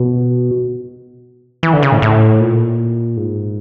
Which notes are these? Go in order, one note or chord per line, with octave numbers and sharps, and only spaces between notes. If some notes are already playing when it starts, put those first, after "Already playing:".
Already playing: B2
E3
D3
C#3
A2
A2
A#2
G#2